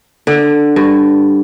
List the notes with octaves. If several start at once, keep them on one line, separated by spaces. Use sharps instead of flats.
D3
G2